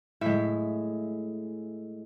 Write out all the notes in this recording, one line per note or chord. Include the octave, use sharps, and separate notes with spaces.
A2 G#3 E5